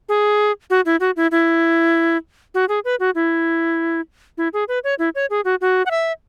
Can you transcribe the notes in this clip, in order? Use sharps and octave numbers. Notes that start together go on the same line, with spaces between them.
G#4
F#4
E4
F#4
E4
E4
F#4
G#4
B4
F#4
E4
E4
G#4
B4
C#5
E4
C#5
G#4
F#4
F#4
F#5
E5